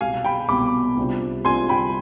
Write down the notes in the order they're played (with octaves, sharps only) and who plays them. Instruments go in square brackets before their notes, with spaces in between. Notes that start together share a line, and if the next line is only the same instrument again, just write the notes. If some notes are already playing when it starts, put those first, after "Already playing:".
[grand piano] C2 B2 B3 [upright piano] F5 G#5
[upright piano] G5 B5
[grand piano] C2 B2 B3 [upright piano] B5 D6
[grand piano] C2 C3 G3 D4 F4
[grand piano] C2 C3 G3 D4 F4 [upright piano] G#5 C6
[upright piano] G5 B5